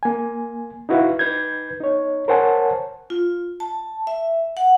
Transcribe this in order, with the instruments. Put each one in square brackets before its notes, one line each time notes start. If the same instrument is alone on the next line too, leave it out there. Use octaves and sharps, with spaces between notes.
[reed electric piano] A#3 G#5
D#4 E4 F#4 B4 E5 F5
D#4 B4 G6 G#6
D#4 C#5
A#4 C5 C#5 F#5 G#5 A5
[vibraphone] F4
A5
E5
F#5